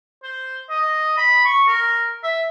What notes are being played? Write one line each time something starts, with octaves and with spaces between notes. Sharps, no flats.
C5
D#5
B5
C#6
A#4
E5